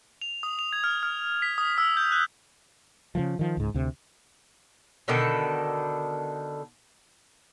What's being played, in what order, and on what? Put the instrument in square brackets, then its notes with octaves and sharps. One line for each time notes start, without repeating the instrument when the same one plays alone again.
[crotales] F7
D#6
F7
G#6
F6
F6
B6
D#6
E6
G6
F#6
[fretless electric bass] C#3 E3 F3
D#3 F3
C#2 G#2
D2 C3
[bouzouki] B2 D3 D#3 A4